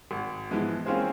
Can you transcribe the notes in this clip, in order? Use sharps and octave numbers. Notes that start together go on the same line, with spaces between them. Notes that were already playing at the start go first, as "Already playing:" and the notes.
G#1
E3 F3 G#3 B3
A#3 C4 C#4 F4 G#4 C5